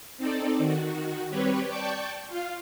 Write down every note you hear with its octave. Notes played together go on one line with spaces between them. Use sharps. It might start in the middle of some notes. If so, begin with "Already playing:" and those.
C4 D#4 A4 D5
D#3 F#4
G3 C4 G4 B4 C#5
D5 G5 A5 C#6 G6
F4 F5